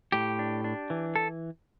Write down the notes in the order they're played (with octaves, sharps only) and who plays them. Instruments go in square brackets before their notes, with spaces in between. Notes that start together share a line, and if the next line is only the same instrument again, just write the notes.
[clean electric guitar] A2 G4
D4
D4
E3
A4